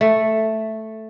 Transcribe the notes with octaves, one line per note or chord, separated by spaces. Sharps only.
A3